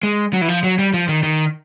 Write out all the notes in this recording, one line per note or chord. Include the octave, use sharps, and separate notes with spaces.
G#3
F#3
E3
F3
F#3
G3
F3
D#3
D#3